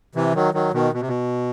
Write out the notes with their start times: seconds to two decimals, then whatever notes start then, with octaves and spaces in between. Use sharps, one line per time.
0.15 C3 E3
0.35 D#3 F#3
0.54 D#3 F#3
0.74 B2 D#3
0.93 B2
1.01 C3
1.08 B2